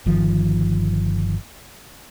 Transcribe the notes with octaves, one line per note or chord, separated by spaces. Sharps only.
G1 D#3 F3